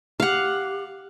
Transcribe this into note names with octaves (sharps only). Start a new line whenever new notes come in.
G4 F5 F#5